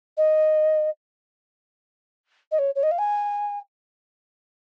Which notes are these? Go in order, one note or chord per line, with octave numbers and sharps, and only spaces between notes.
D#5
D#5
C#5
C#5
D#5
F5
G#5